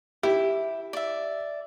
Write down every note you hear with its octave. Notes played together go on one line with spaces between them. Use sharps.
E4 G4
D5 E5